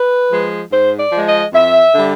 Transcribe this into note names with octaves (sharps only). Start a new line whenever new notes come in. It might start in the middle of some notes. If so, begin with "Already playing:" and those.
Already playing: B4
F3 G#3
G#2 C5
D5
F3 G#3
D#5
F2 E5
D3 G3